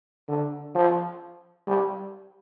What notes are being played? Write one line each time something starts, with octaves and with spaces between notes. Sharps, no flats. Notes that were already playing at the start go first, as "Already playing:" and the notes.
D3
F3
G3